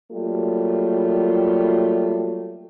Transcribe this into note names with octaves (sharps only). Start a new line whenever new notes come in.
F#3 G3 A3 A#3 F4